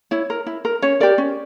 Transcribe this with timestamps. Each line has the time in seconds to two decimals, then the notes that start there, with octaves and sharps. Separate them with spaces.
0.11 E4 C#5
0.30 A#4
0.47 E4
0.65 A#4
0.82 C#4 C#5
1.00 G4 A#4 D5
1.18 C#4